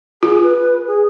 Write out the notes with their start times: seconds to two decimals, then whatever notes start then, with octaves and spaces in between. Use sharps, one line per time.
0.23 F4 G#4
0.42 B4
0.87 G#4